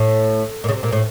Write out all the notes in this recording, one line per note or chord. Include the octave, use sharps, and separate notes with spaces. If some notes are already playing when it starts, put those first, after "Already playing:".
Already playing: A2
A#2
C#3
C3
A#2
A2